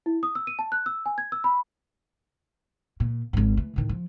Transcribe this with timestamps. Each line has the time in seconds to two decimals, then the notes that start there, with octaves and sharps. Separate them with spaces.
0.06 E4
0.23 D#6
0.35 E6
0.47 D#7
0.59 A5
0.72 F#6
0.86 E6
1.06 G#5
1.18 G#6
1.32 E6
1.44 B5
3.00 A#2
3.33 G#1 G#2
3.57 E3 A3
3.76 A2 D#3
3.89 F3